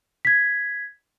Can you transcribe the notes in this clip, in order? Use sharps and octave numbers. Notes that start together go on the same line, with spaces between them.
G#6 B6